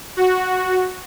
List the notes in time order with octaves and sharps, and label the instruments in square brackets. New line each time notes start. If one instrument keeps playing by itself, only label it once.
[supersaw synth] F#4